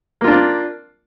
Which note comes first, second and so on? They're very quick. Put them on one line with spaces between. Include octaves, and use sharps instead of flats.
A#3 F4 D4